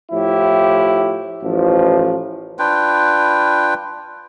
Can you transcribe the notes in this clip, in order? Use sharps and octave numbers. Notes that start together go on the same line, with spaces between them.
A2 F3 E4 G4
A1 F3
D4 F4 B4 G5